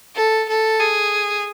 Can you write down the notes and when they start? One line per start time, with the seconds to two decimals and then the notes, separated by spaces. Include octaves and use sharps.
0.15 A4
0.49 A4
0.80 G#4